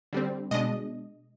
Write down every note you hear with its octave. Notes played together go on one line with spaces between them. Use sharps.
D3 G3 C4
B2 G#3 D4 D#5